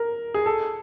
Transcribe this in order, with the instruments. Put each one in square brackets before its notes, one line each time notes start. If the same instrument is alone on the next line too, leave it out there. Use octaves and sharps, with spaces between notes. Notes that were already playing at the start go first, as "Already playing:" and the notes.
Already playing: [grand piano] A#4
G#4
A4